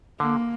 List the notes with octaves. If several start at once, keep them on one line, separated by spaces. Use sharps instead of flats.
D3 A#3